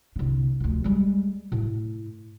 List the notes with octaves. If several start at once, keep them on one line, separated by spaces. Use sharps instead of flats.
C2 D3
D2 F3
G3 G#3
A2